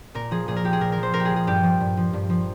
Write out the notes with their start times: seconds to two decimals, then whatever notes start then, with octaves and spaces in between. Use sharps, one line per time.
0.15 A#2 A#4
0.31 F3 G#4
0.48 A#2 G#4
0.56 A#4
0.64 F3 G4
0.73 G#4
0.81 A#2 A#4
0.92 A#4
0.98 F3
1.03 C5
1.14 A#2 A#4
1.20 G4
1.25 G#4
1.31 F3
1.36 G#4
1.47 G2 G4
1.63 F3
1.80 G2
1.97 F3
2.13 G2
2.30 F3